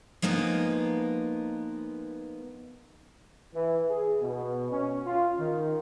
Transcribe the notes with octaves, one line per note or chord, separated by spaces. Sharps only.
F3 G#3 A#3 B3 D#4
E3
G#4
B2
C#4
F4
D#3